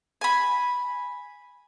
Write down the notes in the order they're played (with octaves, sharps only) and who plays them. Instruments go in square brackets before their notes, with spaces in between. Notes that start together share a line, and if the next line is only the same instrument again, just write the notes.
[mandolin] G#5 B5